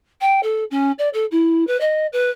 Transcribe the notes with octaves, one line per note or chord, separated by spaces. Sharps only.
G5
A4
C#4
D5
A4
E4
B4
D#5
B4